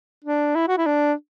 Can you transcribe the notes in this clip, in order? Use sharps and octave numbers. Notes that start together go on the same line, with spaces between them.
D4
E4
F#4
E4
D4